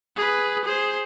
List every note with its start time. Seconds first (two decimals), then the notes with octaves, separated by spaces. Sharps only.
0.16 G#4 B4
0.65 G#4 C5